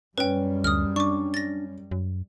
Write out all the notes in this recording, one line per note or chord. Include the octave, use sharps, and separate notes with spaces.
F#2 G3 C#4 B4 G5
D2 D#6 F6
D4 C#6 D6
A6 A#6
F#2